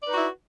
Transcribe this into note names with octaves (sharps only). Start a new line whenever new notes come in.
D#4 E4 F#4 B4 D5